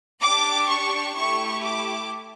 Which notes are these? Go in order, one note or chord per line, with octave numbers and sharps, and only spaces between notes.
D4 G4 D6
C#6
A3 E4 G4 C#6
D6